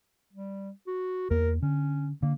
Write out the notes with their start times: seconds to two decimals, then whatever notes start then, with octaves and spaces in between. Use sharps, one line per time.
0.33 G3
0.87 F#4
1.30 E2 A#3 A#4
1.62 D3 C#4
2.23 D3 A#3